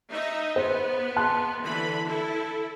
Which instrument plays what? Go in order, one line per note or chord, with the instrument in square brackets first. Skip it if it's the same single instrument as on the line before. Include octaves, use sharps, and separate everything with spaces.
[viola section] D#4 D#5 E5
[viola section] B3 [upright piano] C5
[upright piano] A5 C6 F#6
[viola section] D3 E3 B5
E4 A4